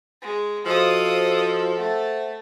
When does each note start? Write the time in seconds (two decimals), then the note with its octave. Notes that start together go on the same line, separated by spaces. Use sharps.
0.22 G#3
0.66 F3 F#4 A4 C5 D#5 F5 D#6
1.77 A3 A4 C5 E5 F#5